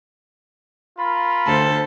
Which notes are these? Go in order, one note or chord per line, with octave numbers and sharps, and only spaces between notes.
F4 A#4 B5
D2 A4 C5